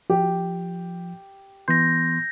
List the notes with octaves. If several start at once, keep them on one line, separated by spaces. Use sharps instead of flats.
F3 G4
E3 B3 C6 G6 A#6